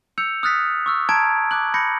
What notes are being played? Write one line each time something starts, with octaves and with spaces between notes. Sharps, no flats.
E6 G6 C#7 F7
D#6 F6 F#6 A6 B6
C#6 E6 F6
A5 A#5 G#6 D7
D6 F#6 F#7
B5 G6 A#6 C#7